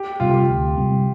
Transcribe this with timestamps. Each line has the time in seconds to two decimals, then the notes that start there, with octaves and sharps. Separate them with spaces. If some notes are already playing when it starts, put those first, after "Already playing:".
Already playing: G4
0.20 C3 G3 C4 F4
0.30 G4
0.40 F4
0.49 D2
0.77 C3 G3 C4